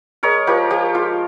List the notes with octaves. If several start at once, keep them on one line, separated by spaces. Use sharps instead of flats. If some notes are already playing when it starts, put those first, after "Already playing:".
G#3 A#4 C#5
F3 G4 A#4
F3 G4
G#3 F4